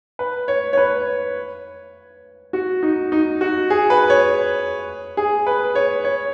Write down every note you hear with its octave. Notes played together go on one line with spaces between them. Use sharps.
B4
C#5
C#5
B4
F#4
D#4
D#4
F#4
G#4
B4
C#5
G#4
B4
C#5
C#5